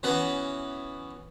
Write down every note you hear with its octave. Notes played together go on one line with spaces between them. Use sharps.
E3 B3 C#4 F#4 B4 F#5